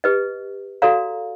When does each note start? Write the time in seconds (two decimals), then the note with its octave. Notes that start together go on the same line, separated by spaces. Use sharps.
0.04 G4 B4 D#5
0.82 F#4 A4 D5 F5 A#5